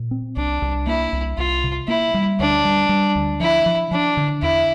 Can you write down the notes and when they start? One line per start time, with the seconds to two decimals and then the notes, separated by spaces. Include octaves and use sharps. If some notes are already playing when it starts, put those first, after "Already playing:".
Already playing: A#2
0.11 C4
0.37 C2 D4
0.62 C2
0.86 A#3 E4
1.13 C2
1.38 C2 F4
1.64 C3
1.88 A#3 E4
2.14 G3
2.39 D2 D4
2.65 G3
2.89 G3
3.15 D2
3.40 F3 E4
3.66 F3
3.91 F3 D4
4.17 D3
4.42 E2 E4